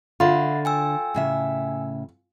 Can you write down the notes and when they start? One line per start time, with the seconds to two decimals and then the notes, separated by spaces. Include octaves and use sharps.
0.20 D3 F4 E5 F#5 B5
0.65 G5 G#5 E6
1.14 A2 C#3 E5